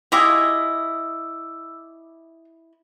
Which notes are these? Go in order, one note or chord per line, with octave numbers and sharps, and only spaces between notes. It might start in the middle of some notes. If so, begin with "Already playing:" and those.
E4 F4 G4 G#4 D#5 D6 E6